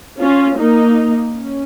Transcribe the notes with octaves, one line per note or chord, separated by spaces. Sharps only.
C#4 F4
A#3 D#4
C#4